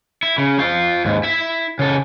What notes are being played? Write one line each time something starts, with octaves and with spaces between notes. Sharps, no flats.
E4
C#3
C4 F4
D#2 G#2
E4 E5
C#3 A4